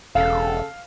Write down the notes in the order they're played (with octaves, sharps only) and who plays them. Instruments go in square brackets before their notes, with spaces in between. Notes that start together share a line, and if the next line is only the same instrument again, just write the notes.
[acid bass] E1 [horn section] C#3 A4 [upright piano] F5